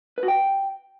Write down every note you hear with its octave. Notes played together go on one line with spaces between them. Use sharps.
B4
F#4
G5